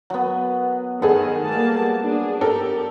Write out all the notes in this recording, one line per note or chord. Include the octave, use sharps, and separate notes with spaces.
F#3 B3
D#3 B3 G#4 A4
G3 A#3 A5
D4 G#4
G4 A4 A#4